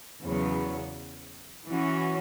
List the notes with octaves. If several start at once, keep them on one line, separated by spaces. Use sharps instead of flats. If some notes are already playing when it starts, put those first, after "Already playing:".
E2 C#3 F#3 B3
E3 C#4 F#4